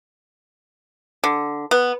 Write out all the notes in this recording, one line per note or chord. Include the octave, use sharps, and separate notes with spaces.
D3
B3